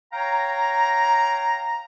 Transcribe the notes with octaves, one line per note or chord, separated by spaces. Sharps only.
C#5 F5 G5 A#5